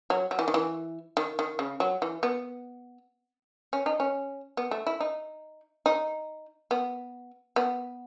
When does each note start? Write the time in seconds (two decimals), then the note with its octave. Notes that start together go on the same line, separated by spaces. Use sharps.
0.10 F#3
0.31 F#3
0.39 E3
0.48 D#3
0.54 E3
1.17 D#3
1.39 D#3
1.59 C#3
1.80 F#3
2.02 E3
2.23 B3
3.73 C#4
3.86 D#4
4.00 C#4
4.57 B3
4.71 A3
4.87 E4
5.00 D#4
5.86 D#4
6.71 B3
7.56 B3